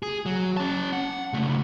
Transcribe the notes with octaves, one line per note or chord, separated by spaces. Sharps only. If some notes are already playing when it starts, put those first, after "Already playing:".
G#4
F#3
C#4 A5
F#5
C#2 A3